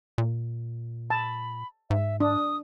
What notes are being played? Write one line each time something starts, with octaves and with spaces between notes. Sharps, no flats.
A#2
A5 B5
G#2 E5
D4 D#6